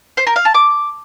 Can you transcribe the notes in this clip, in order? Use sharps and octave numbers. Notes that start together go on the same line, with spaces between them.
C5
A#4
F5
A5
D6